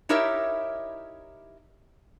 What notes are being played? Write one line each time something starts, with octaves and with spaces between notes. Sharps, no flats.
D#4 E4 G4 A#4 C#5 E5